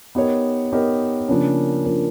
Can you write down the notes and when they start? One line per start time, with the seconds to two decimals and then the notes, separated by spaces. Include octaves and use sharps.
0.15 B3 D#4 G4 A#4 C#5
0.72 B3 D#4 G4 A#4 C#5
1.29 C#3 F3 A#3 D4
1.85 C#3 F3 A#3 D4